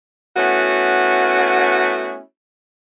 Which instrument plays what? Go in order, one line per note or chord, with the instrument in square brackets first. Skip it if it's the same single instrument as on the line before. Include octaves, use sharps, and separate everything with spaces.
[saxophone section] A3 B3 C#4 E4 F#4